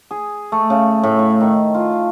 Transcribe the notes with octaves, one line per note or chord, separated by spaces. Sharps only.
G#4
A3
C#3
A2
E4
D#3
F4